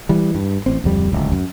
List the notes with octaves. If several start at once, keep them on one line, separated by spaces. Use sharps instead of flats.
E3 G3
G2
A1 C4
D1 F2 G3
D1 C#2
F#2